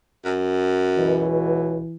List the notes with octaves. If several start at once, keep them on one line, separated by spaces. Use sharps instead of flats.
F#2
C#2 B2 E3